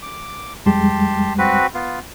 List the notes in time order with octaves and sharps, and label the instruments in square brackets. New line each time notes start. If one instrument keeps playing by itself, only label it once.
[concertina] D6
[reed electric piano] F2 G3 G#3 [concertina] G4 A5 C6
[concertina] C4 F#4 B4
B3 F4